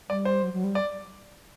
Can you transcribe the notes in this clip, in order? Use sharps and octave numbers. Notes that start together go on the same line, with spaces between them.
G3 D5
C5
F#3
F#3
G3
D5